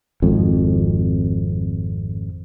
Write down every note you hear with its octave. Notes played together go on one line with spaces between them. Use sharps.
G#1 F2